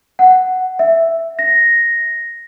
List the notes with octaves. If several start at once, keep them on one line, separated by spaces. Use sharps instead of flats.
F#5
E5
A#6